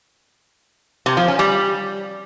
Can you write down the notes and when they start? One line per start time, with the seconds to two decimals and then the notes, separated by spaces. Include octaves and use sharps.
1.06 C3
1.17 F3
1.28 C#4
1.39 G3